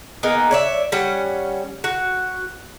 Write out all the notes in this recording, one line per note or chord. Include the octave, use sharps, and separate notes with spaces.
A#3 B3 D#4 G#4
C#5 D5 E5
G3 C#4 F#5
F#4